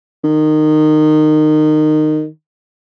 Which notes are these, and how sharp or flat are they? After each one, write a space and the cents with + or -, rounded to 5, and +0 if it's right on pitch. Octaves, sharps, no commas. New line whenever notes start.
D#3 -20